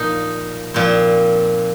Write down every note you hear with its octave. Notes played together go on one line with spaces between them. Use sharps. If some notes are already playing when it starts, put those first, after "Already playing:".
Already playing: A#2 F3 D#4
A#2 F3 C4